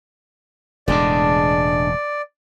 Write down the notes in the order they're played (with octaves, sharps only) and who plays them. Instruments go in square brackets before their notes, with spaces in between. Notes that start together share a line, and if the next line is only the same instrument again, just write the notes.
[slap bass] E1 A2 C#3 [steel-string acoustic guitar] G#3 D4 [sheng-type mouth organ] D5